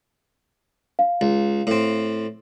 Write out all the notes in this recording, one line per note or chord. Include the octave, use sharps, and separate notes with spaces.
F5
C#2
A2 C4